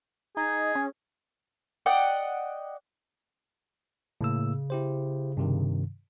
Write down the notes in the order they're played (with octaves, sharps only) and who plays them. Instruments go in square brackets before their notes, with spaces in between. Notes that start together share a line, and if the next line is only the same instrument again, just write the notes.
[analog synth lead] D#4 [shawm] G#4
[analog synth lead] C#4
[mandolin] D5 D#5 F#5 G5
[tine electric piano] A2 A#3 E6 [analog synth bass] C#3
[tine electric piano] E4 G4 C5
G2 C3 D#3